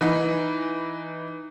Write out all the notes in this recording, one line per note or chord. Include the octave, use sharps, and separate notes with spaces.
E3 D#4 B4